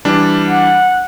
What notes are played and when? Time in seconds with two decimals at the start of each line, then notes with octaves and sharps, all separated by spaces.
0.05 E3 G3 D4
0.47 F#5